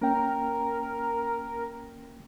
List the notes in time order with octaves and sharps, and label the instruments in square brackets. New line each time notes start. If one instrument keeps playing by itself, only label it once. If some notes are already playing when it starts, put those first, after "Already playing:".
[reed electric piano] A#3 C#4 G5 [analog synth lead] A#4